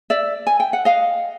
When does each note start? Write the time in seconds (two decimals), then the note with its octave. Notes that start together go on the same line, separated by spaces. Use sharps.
0.10 D5 E5
0.47 G#5
0.60 G5
0.73 F#5
0.85 D#5 F5